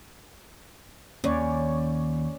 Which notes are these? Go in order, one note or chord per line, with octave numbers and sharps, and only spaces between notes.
D#2 C#4 C#5 D5